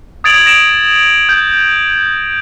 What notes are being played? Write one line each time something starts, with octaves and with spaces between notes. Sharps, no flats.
D#6 G#6 A6 D7 F7 F#7
A#6 D7 E7 F7
G6